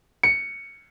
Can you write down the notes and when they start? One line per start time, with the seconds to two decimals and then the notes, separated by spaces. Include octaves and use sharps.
0.23 C#7